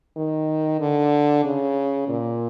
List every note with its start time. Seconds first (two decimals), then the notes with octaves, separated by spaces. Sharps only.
0.17 D#3
0.80 D3
1.44 C#3
2.08 A#2